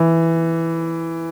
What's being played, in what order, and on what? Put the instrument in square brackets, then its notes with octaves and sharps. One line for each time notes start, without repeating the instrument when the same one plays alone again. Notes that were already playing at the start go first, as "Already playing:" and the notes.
Already playing: [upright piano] E3